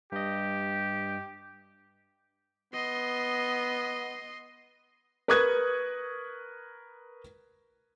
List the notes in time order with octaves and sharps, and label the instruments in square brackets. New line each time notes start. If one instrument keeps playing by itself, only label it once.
[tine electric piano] G2 D#5 [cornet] G4
[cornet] B3 [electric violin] D#5 C6
[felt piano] A#4 B4 C#6 D#6 F#6 G#6